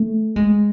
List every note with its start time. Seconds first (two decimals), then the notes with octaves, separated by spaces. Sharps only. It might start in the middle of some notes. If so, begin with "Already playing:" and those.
Already playing: A3
0.36 G#3